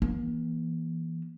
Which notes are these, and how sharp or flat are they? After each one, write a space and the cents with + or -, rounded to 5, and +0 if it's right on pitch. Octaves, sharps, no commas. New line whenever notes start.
E3 +0 A#3 +35